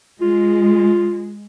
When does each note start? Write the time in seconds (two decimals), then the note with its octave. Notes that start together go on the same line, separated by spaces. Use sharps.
0.21 G#3 F4